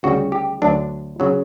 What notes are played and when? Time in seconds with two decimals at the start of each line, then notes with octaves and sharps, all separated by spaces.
0.03 D2 C#3 G3 F#4
0.32 G4
0.62 D2 D3 F#3 D4
1.20 C#3 F#3